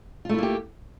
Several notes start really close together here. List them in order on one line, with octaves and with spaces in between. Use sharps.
F4 A3 E4 A#3 G4